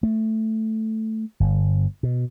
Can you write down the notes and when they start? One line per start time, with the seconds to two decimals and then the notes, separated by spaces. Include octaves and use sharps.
0.03 A3
1.40 G1
2.03 B2